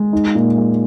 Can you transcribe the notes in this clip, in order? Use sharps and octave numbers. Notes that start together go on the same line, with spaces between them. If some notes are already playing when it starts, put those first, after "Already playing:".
Already playing: G#3
D#4
A#2
G#3